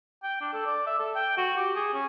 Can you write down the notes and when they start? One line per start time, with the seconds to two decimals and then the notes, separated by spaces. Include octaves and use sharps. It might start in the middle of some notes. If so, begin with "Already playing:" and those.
0.23 G5
0.41 D4
0.53 A4
0.66 D5
0.87 E5
0.99 A4
1.16 G5
1.37 F#4
1.57 G4
1.76 G#4
1.94 C#4